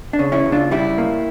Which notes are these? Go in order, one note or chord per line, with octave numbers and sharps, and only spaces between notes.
D4
C#3
C#4 E4
C#3
D4 F4
G3 E4 G4
A#3